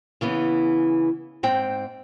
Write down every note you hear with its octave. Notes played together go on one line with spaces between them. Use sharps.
C#3 E3 B3
G#2 C4 G5